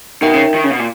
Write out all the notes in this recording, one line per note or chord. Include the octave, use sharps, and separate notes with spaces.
B2 D#4 A#4 E5 G5
C#3
D#3
C#3
B2
A#2